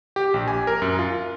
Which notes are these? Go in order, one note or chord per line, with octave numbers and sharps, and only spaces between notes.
G4
A#1
G#5
A#4
F#2
F4